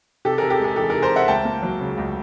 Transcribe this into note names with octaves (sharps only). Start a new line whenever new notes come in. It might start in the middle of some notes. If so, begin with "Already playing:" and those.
C3 G4 A4
C3 G#4 A#4
G4 A4
G#3 G#4
E3 G4 A4
C3 G#4 A#4
A#4 C5
C3 E5 F#5
C#2 G5 A5
A#3
F#3
C#3
C#2